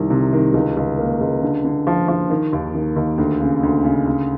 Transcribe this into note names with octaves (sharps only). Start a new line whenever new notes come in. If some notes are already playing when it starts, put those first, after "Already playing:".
Already playing: C2 D#3
C3
D#3
C#2
C#2
A#3
C#2
D3
D3
F3
F3
D#3
D#2
D#3
D#2
D2
C#3
D2
C#3
C#3